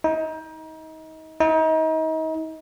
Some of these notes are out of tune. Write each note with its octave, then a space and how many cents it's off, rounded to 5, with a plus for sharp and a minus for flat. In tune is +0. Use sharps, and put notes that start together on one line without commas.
D#4 +30
D#4 +35